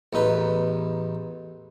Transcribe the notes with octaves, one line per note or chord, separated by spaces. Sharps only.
A1 E2 D#4 B4